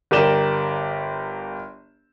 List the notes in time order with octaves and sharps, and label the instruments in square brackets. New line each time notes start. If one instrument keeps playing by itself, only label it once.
[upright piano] G1 G4 A#4 D5 E7 G7